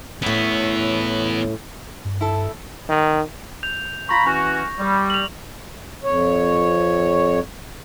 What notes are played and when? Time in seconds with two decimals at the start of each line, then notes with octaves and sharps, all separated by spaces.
0.22 A2 B3 C#4 E4
2.05 G2
2.21 E4 A4
2.89 D#3
3.63 G6 F7
4.09 F4 A#5 B5 C#6 A#6
4.26 E3 C#4 F#4
4.79 G3
5.10 F7 F#7
6.04 F2 C#5